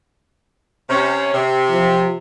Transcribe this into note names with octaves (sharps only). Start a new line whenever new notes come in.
C3 C#4
C3
F3